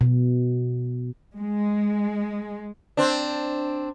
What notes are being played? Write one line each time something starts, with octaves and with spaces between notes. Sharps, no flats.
B2
G#3
C4 D4